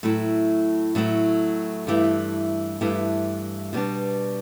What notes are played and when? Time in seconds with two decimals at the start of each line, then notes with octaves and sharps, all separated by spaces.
0.03 A2 F#3 A3 E4
0.95 A2 F#3 A3 E4
1.87 G2 E3 A3 E4 G4
2.81 G2 E3 A3 E4 G4
3.73 B2 G3 B3 D4